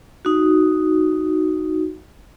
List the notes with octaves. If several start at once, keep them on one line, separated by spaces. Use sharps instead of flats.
D#4 F#4